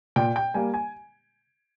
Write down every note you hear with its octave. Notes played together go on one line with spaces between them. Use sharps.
A#2 G5
G5
G3 A#3 G#5
G#5